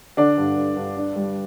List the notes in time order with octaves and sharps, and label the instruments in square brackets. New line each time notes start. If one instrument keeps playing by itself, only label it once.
[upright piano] D3 D4 D5
G2
G2
G2
D4
G3